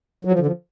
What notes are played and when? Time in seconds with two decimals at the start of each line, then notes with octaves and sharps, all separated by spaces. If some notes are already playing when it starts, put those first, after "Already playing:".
0.25 F#3
0.32 F3
0.39 D3
0.47 F3